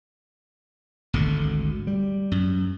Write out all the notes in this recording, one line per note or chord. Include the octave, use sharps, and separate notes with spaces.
G#1 D2 D3
G3
F#2